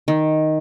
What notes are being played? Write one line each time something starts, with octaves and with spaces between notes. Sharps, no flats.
D#3